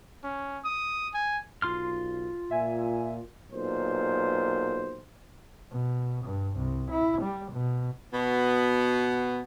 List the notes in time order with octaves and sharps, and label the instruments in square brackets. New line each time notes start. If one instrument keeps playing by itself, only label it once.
[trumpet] C#4
D#6
G#5
[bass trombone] B1 [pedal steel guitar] F4 C6 F6
[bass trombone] A#2 [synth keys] E5 G#5
[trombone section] B1 A#2 C5
[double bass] B2
G2
C2
E4
G3
B2
[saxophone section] B2 B3